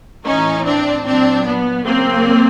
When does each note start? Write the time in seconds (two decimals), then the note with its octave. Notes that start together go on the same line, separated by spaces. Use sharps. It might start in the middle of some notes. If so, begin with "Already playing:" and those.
0.25 A2 E3 C#4 D#4
0.65 C4 D4
1.05 A#2 F#3 C4 D4
1.46 B3
1.86 C#3 F#3 A#3 C4